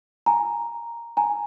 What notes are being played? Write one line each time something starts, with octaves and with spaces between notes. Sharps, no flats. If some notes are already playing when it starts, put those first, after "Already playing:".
G#5 A#5
G#5 A#5